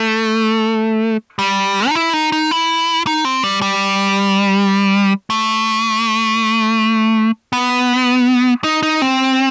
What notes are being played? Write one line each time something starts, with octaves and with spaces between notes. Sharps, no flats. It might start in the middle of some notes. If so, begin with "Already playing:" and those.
Already playing: A3
G3
D#4
E4
D#4
D#4
E4
D#4
C4
G3
G3
A3
B3
D#4
D#4
C4